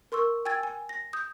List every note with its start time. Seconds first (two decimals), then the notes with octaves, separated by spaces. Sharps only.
0.12 A#4 C6 C#6 E6
0.45 G5 G#5 E6 G#6 A6
0.63 G#5
0.89 A#6
1.13 D#6 G6